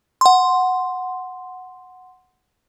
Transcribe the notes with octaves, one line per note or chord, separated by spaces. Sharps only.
F#5 C6